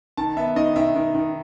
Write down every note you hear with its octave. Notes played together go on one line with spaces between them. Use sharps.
D#3 A5
B3 E5
D#3 D#5
D#3 E5
D#3
D#3